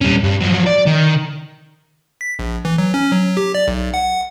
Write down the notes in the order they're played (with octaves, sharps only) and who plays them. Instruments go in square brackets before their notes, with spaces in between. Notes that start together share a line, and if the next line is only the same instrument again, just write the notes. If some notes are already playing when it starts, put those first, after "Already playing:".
[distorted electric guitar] G3 C#4
G2
F3 F#3
D5
D#3
[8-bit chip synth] B6
A#1
E3
F#3
C#4
F#3
G4
D5
B1
F#5